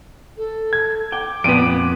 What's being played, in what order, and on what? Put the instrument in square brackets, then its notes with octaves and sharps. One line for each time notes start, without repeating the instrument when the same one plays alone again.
[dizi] A4
[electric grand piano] G#6
[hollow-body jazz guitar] G5 [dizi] D6
[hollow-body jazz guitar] F2 A#2 B3 [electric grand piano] D7 D#7